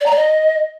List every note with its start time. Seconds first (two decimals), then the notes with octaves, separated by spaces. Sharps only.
0.01 D5
0.06 A#5
0.11 D5
0.16 D#5